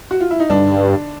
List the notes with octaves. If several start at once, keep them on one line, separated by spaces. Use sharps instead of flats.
F#4
F4
E4
D#4
G2 D3 D4